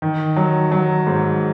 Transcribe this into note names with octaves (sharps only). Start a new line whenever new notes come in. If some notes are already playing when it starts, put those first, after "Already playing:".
D#3
F#3
F#3
G#2